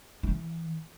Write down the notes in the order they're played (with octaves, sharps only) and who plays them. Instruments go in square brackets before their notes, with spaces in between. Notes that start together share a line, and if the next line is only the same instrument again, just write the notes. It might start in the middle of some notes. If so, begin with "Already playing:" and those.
[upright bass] E3